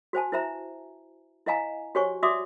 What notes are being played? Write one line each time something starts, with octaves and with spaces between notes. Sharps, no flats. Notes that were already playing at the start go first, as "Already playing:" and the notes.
F#4 C5 G#5 A5
E4 B4 C5 E5 A#5
E4 B4 D#5 F5 G#5 A#5
F#4 G4 C5 C#5 G#5 C#6
F#4 D5 E5 C6 D6 D#6